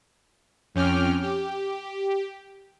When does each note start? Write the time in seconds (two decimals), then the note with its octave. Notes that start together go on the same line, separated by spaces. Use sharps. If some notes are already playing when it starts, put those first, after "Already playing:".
0.75 F2 C#4 G5 D6 F6
1.22 G4